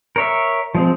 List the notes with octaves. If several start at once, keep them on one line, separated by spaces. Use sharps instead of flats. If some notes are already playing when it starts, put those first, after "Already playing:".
A#4 C#5 E5
F3 G#3 C4